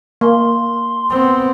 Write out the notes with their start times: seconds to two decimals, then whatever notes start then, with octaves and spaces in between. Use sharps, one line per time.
0.21 A#3 C6
1.10 B3 C4